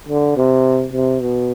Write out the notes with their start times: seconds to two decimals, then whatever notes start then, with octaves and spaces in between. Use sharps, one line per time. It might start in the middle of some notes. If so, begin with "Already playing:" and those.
0.08 D3
0.37 C3
0.93 C3
1.22 B2